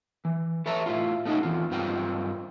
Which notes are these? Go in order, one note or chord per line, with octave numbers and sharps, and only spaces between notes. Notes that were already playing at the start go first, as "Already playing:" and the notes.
E3
A4 B4 C#5 E5 A5 A#5
A2 E4 F4
A3 C#4 D#4 F#4 A4
E2 G#2 E3 C4 F4
G2 C4 F4 A#4 C5 G5